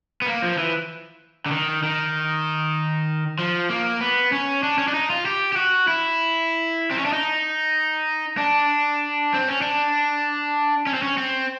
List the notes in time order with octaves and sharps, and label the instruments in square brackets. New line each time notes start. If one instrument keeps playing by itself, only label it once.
[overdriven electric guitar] B3
A#3
F3
E3
D3
D#3
D#3
F3
A#3
B3
C#4
D4
C#4
D4
D#4
F4
G4
G4
F#4
E4
C4
C#4
D4
D#4
D4
C4
C#4
D4
C#4
C4
C#4
C4